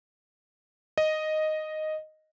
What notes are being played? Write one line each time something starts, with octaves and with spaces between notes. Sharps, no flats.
D#5